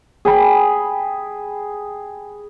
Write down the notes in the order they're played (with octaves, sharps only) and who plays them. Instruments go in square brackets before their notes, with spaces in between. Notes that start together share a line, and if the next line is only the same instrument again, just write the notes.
[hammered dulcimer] G#4 G5 B5